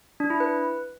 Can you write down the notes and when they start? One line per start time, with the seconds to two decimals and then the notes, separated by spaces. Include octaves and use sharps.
0.20 D4
0.30 E4
0.40 B4